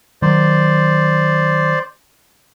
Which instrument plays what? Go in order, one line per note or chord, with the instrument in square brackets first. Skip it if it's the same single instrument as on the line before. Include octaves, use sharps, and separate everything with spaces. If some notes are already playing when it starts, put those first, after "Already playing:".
[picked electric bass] D#3 F#3 [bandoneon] C5 D5